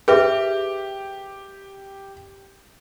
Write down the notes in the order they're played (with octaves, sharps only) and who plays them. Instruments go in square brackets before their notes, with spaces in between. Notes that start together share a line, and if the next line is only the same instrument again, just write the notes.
[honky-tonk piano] G4 [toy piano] G#4 B4 E5